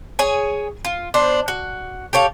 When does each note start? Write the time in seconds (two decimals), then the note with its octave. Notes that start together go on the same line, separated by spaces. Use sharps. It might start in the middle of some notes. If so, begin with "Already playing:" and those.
0.19 G#4 C#5 G#5
0.85 F4
1.14 B3 D4 C5
1.48 F#4
2.13 G4 A4 C#5 F5